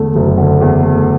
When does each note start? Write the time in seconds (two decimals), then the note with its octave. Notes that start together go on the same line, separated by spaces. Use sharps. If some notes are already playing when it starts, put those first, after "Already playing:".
Already playing: E2 D3 A3
0.15 F#1
0.38 D3
0.61 E2
0.83 A3